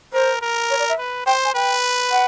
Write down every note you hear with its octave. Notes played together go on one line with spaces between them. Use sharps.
A#4 C5
A#4
C#5
D5
E5
B4
C5 G5
G#5
B4 G5
F#5